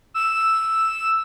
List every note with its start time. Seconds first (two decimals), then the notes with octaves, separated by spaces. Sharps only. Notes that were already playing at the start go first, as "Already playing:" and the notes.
0.14 E6